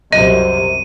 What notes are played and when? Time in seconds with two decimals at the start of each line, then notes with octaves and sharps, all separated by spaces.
0.12 C2 F#2 C3 D#5 D#7